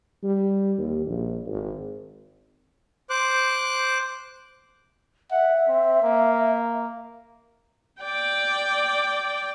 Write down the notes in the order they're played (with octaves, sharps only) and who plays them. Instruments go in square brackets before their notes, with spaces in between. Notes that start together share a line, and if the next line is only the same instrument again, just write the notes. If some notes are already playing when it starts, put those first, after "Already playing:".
[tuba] G3
D#2
A#1
G#1
[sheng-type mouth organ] C5 D6 F#6
[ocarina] E5 [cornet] F#5
[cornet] C4
A#3
[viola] D5 G5